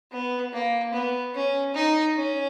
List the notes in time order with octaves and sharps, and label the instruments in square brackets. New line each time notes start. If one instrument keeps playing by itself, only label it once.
[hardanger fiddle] B3
A#3
B3
C#4
D#4
C#4